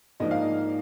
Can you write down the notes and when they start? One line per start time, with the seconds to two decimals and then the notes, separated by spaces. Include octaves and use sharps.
0.20 G#2 F3 A#3 D4 D#5
0.31 F5
0.41 D#5